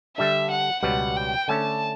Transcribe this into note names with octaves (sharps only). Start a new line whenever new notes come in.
D3 G3 D4 A4 E5
F#5
C#2 B2 G3 B3 F#5
G5
D3 A3 C#4 A5